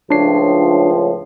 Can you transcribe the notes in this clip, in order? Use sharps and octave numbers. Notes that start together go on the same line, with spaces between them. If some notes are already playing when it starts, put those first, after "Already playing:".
C#2 A2 F3 D4 C#5 C7